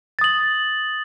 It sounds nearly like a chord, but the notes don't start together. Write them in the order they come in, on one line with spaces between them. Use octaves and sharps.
A6 D#6 F#7